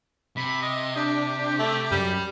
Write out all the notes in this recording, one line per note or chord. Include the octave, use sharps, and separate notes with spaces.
C3 B5
D#5
D4 G4
A3
F#2 G3